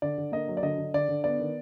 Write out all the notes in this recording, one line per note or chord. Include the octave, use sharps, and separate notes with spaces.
D3 D5
D3
A#3 D#5
F#3
D5
D3 D#5
D3
D3 D5
D3
B3 D5
D#3